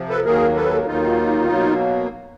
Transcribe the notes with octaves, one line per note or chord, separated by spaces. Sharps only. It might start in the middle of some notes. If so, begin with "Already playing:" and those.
Already playing: C3 F3
A4 B4
D#2 D#3 F#3 A#3 G#4 A#4
A4 B4
D#2 D#3 F#3 A#3 D#4 F4
B2 F#3 A#3